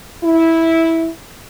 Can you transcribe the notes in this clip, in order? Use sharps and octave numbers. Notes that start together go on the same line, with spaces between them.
E4